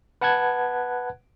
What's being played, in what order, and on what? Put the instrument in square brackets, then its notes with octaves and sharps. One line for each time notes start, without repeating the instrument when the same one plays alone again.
[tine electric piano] B4 F#5 A5 F#6 G#6